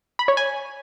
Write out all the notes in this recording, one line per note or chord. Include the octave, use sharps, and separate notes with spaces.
B5
C#5
G#5